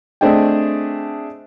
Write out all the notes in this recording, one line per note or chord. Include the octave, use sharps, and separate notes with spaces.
A3 C4 D4 G#4 D#5 G5